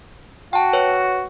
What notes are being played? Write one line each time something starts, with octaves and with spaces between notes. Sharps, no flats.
F#4 G5 A5
B4 C#5